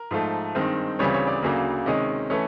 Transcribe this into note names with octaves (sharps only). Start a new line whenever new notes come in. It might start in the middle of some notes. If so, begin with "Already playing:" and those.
Already playing: A#4
G#2 F3 A3
G2 D#3 G#3 C4
D2 C#3 E3 G3 C4 C#5
C#5
D5
D2 C#3 F#3 A#3
C3 D#3 G#3 C#4 D#5
E3 A3 C#4